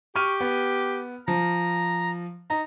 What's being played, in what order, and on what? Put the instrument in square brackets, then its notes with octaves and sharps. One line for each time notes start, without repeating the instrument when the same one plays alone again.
[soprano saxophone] G4 [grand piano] C#6 F6 D#7
[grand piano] B3
[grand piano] F3 [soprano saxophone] A#5
[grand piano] D#4 [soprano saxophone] A#5